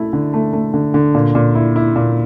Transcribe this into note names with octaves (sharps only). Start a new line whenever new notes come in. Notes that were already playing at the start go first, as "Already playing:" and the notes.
Already playing: A3 E4
D3
A3
A3
D3
D3
A#2
A#2
E4
E4
A#2